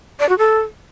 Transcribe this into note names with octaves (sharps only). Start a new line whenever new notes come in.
D5
F#4
A4